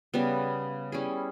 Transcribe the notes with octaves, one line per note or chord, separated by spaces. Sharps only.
C#3 G3 B3
G3 C#4 E4 G#4